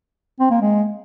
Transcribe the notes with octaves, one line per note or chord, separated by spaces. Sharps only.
C4
A#3
G#3